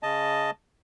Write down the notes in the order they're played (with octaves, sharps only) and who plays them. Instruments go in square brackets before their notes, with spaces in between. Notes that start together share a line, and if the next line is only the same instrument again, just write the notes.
[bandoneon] C#3 D#5 A5